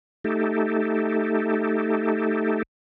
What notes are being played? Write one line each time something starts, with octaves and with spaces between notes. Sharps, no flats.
A3 D#4 G4 A4